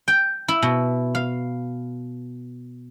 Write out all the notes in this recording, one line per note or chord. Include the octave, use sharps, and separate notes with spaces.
G5
E4
B2
F5